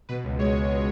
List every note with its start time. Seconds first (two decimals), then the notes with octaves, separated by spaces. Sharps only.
0.09 B2 B4
0.24 C#2
0.39 G#3 C#5
0.54 C#2
0.70 B2